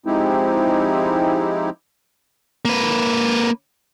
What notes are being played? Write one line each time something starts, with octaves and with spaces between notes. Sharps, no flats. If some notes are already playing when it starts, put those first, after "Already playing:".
F3 G#3 C4 D#4 E4 G4
A#3 B4